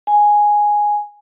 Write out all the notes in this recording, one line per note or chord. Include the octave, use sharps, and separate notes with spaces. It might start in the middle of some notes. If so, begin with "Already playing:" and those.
G#5